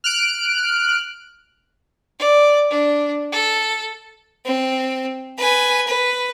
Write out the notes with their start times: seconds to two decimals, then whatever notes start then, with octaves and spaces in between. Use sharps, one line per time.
0.04 F6 F#6 D7
2.19 D5
2.70 D4
3.32 A4
4.45 C4
5.38 B4 G#5
5.87 B4